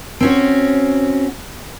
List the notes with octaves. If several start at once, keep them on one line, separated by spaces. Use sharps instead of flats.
C4 C#4 F#4